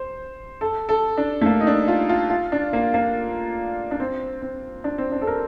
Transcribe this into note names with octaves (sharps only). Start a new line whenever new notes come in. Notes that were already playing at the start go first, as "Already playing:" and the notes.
Already playing: C5
A4
A4
D4
A3
A#3
D#4
D4
F4
F4
F4
D4
A#3
A#3
D4
C4
C4
D4
C4
D4
A4
A#4